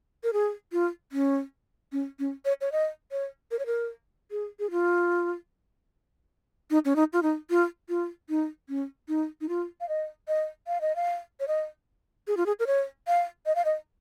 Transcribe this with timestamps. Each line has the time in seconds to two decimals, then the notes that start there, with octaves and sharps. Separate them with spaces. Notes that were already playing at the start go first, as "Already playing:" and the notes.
0.24 A#4
0.33 G#4
0.72 F4
1.12 C#4
1.92 C#4
2.19 C#4
2.45 C#5
2.61 C#5
2.72 D#5
3.12 C#5
3.51 A#4
3.59 C#5
3.66 A#4
4.31 G#4
4.59 G#4
4.71 F4
6.70 D#4
6.85 C#4
6.96 D#4
7.13 F4
7.23 D#4
7.50 F4
7.89 F4
8.29 D#4
8.69 C#4
9.08 D#4
9.41 D#4
9.49 F4
9.81 F5
9.89 D#5
10.28 D#5
10.67 F5
10.81 D#5
10.96 F5
11.40 C#5
11.48 D#5
12.27 G#4
12.37 F4
12.46 G#4
12.60 A#4
12.67 C#5
13.07 F5
13.46 D#5
13.56 F5
13.65 D#5